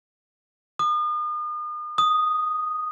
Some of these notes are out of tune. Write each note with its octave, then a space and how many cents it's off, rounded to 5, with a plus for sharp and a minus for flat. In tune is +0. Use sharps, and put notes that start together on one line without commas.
D#6 -40
D#6 -5